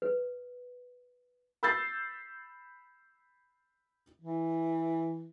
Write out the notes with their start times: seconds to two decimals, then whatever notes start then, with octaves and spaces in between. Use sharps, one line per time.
0.02 B4
1.63 B5 E6 G6 A6 C7
4.21 E3